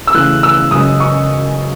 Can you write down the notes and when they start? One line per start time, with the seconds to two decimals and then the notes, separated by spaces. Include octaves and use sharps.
0.07 E6
0.14 C#3 E3 A3 F#6
0.43 E6
0.71 F#2 C#3 G#3 D#6
1.00 C#6